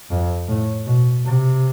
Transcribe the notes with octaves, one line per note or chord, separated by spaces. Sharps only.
F2
A2
B2
C3